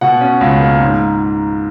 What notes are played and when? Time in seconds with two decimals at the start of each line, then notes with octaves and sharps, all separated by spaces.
0.01 B2 F#5
0.21 C#4
0.41 C#2
0.60 A#3
0.80 G#2